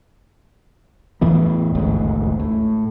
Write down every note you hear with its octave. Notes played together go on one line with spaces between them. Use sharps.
E2 A2 E3 B3
D#1 A1 D2 G#2
A2